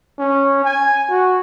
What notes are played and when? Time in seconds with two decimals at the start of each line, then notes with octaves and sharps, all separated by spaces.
0.19 C#4
0.65 G#5
1.10 F#4